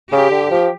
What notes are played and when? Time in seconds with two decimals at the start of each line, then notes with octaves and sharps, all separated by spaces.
0.12 C#3 G4
0.31 D3
0.51 F3